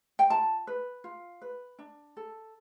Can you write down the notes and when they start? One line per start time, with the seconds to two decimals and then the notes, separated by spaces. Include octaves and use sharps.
0.19 G5
0.30 F4 A5
0.67 B4
1.04 F4
1.42 B4
1.79 D4
2.17 A4